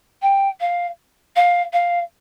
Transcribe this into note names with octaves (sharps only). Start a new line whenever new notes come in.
G5
F5
F5
F5